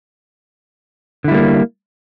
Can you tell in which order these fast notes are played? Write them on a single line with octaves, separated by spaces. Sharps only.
D3 E4 G3 A#3